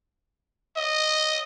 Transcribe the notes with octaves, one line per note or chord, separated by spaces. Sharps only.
D#5